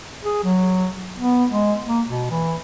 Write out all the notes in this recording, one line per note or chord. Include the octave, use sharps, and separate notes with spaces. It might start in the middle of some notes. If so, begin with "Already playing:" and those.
G#4
F#3
B3
G#3
A#3
B2
E3